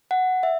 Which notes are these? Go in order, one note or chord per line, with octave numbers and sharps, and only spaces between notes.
F#5
E5